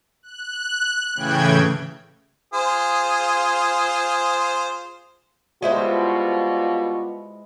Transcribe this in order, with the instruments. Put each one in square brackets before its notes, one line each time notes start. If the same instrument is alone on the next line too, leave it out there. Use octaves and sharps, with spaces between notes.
[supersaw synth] F#6
A2 C#3 E3 G5 G#6
[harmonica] F4 G#4 C5
[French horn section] B2 G3 F4 [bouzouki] G#3 E4 C5